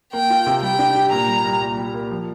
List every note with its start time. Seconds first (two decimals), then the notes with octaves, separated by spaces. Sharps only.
0.13 A#3 G5
0.30 F4
0.46 C3
0.62 G3 G5
0.79 D4
0.95 G4
1.12 A#2 A#5
1.28 G3
1.45 C2
1.62 A#2
1.78 G3
1.94 A#3
2.11 F3